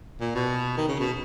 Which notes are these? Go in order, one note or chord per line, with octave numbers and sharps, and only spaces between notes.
A#2
B2
D#3
C#3
B2